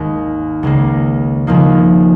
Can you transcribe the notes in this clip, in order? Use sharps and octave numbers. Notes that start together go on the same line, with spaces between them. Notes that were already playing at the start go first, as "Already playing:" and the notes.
Already playing: G#1 D#2 G#2 D#3 G#3 D#4
C#2 C#3 A#3
D#2 C#3 F3 A#3 D#4